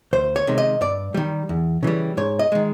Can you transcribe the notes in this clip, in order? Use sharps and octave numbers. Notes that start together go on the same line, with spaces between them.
D2 C5
C#5
C3 D#3 G#3
D#5
G2 D5
D#3 G3
E2
C#3 E3 G3
G#2 C#5
D#5
D#3 G#3